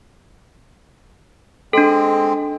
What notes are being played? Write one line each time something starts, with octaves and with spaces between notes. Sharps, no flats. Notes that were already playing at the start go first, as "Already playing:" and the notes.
G#3 C4 D4 A4